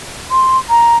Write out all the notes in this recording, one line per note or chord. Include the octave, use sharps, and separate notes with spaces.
C6
A#5